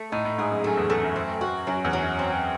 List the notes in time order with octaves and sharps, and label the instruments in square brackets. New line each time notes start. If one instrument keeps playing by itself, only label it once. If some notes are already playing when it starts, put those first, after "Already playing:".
Already playing: [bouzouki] A3
[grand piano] A2 [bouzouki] D#4
[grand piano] A2
[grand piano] G#2 [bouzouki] G#4
[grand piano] F#2
[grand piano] F#2 [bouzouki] A3
[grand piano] E2
[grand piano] E2 [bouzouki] A3
[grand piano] F#2
[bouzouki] C4
F#4
[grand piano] F#2 [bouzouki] F#3
[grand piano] E2
[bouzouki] F#3
[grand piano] F#2
[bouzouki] C4